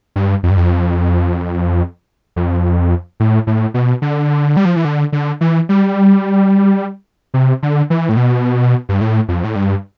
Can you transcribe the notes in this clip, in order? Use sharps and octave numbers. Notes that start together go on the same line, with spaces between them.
G2
F2
G2
F2
F2
A2
A2
B2
D3
G3
F3
E3
D3
D3
E3
G3
C3
D3
E3
A2
B2
G2
A2
F2
A2
G2